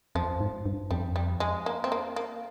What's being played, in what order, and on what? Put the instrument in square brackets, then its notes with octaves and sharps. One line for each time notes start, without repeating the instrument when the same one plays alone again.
[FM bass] F2 [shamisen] F3
[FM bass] G#2
G2
[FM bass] F2 [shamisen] G3
[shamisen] G3
G#3
A#3
C4
A#3
A#3